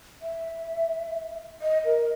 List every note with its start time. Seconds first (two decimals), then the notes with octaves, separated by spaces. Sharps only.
0.22 E5
1.62 D#5
1.85 A#4